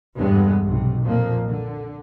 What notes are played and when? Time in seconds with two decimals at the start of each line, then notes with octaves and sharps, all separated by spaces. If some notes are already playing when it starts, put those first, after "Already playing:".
0.18 E2 G2 D3 E3 G#3 B3
0.63 B1 C3
1.02 F2 A#2 F3 A#3
1.47 D3